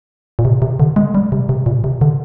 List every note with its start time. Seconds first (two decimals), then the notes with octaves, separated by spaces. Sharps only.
0.39 A#2
0.45 C3
0.62 C3
0.80 D3
0.96 G#3
1.15 G3
1.32 C3
1.49 C3
1.66 A#2
1.84 C3
2.01 D3